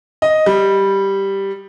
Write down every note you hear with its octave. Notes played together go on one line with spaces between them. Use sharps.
D#5
G3